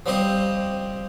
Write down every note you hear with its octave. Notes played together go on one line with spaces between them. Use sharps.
F3 G3 C4 C5 D#5